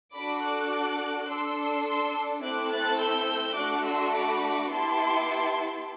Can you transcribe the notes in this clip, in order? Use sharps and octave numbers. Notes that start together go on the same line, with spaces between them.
D4 F#4 A4 B5 D6
D6 F#6
D4 A4 C6 E6
C6 E6
A3 C4 E4 A4 D6 F#6
F#6 A6
E6 G6
A3 D4 F#4 D6 F#6
C6 E6
B5 D6
B3 E4 G4 A5 C6